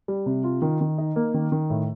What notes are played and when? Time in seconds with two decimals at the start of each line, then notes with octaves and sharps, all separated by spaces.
0.08 G3
0.26 C3
0.44 F4
0.62 D#3
0.81 D#3
0.98 D#4
1.16 A#3
1.34 D#3
1.52 D#3
1.70 A2